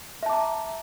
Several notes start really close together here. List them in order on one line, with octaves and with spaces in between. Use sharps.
E5 A5 D6 A#5